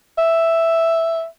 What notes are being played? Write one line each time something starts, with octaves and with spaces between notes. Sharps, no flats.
E5